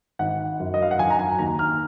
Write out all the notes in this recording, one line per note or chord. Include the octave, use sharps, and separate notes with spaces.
G#1 F#5
F#2
D#5
F5
F#5
F#3 G#5
A#5
G#5
D#2 A#5
F6